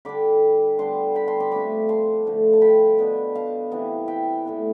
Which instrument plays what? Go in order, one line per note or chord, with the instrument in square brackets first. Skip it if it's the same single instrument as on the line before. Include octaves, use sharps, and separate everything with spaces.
[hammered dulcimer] D3 G3 D4 B5 D6
D3 G3 B3 A5 C6
G5 B5
A5 C6
B5 D6
C3 F3 A3 D4 B5 D6
A5 C6
D3 F3 A3
A5
G5 B5
B2 B3 D4
F5 A5
C3 E3 B3
E5 G5
A2 E3 B3